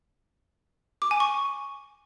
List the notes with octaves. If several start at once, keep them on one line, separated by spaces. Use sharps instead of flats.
D6
G#5
C#6